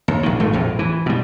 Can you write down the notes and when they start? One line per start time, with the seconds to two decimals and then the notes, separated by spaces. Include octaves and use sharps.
0.08 D#2
0.23 A#1 D#3
0.40 G#1 A3
0.53 A#1 F2 A2
0.79 E3
1.06 B2 G3